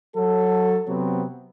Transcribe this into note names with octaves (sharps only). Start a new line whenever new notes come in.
F#3 A4
C3 F#3 B3 C4